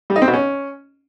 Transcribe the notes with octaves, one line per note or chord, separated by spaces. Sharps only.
G3
D#4
C4
B2
C#4